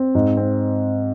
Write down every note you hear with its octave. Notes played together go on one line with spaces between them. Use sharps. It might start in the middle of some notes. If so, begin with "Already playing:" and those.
Already playing: C4
G#2
C4